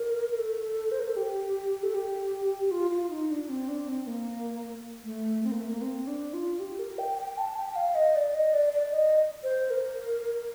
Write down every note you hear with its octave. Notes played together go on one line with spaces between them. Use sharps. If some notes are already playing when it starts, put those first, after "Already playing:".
Already playing: A#4
A#4
A4
C5
A#4
A4
G4
A4
G4
G4
F4
F4
D#4
D4
C4
D4
C4
A#3
A3
C4
A#3
A3
A#3
C4
D4
F4
G4
A#4
G5
G5
G5
A5
G5
G5
F5
D#5
D5
D#5
D5
D5
D#5
C5
A#4